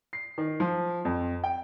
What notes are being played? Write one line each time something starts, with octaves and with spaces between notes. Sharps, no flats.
C7
D#3
F3
F2
G5